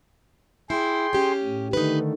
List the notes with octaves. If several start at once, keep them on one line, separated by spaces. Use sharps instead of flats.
E4 G#4 G5 C6
C#4 G4
A2
D3 D#3 A3 D#4 B4